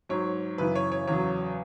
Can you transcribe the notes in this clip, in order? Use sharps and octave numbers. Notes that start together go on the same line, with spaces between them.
G#2 F#3 C#5
F#2 C#3 E3 B4
C#5
C#5
E2 C#3 F#3 C#5